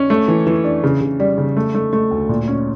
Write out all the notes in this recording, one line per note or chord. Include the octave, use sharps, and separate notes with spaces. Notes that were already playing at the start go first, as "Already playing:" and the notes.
Already playing: C#4
A3
E3
E3
D4
C#3
C#3
G3
C#3
A3
A3
A3
D2
A#2
C#4